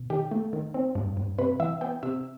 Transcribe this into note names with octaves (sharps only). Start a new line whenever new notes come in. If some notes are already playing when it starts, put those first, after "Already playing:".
Already playing: B2
D#3 G4
A3
D#3
C4
G2
G2
C3 B4
E3 E5
B3 G5
C3 E5